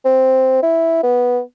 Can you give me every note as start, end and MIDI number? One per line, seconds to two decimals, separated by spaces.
0.05 0.57 60
0.63 0.99 64
1.03 1.40 59